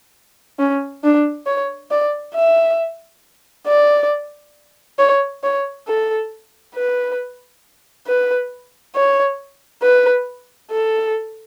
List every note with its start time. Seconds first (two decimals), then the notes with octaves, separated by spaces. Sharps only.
0.59 C#4
1.04 D4
1.47 C#5
1.91 D5
2.35 E5
3.67 D5
4.99 C#5
5.43 C#5
5.88 A4
6.75 B4
8.07 B4
8.95 C#5
9.82 B4
10.71 A4